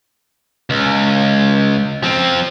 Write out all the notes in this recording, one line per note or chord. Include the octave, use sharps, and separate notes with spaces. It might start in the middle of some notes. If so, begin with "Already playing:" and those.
C#2
F3 C4